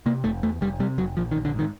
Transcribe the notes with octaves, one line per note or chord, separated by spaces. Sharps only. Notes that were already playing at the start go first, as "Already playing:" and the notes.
C3 A#3
F1 A3
E2 A3
F1 G3
C3 G3
F1 F#3
A#1 F3
D#3
A#1
D3
G#2 D#3